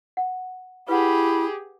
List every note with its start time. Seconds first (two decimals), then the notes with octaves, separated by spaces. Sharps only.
0.17 F#5
0.88 E4 G4 G#4 B4 F#5 B5